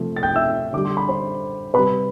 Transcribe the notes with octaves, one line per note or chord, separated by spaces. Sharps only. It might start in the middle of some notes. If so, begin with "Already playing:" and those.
Already playing: C3 F3 A3
A6
G5 G6
E5 E6
D3 G3 D6
C6
B5
C5 C6
C3 G3 B4 B5